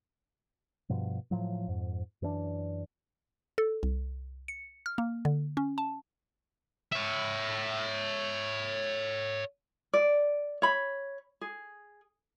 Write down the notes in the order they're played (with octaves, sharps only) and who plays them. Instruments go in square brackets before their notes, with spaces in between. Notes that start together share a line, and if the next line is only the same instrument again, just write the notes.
[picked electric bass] G2 B2 F3
A2 F3 F#3
F2 G#2
F#2 E3 B3 D4
[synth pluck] A4
C2
C#7
F6
A#3
D3
C#4
A5
[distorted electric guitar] C#5 E5
[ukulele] D5
C#5 B5
G#4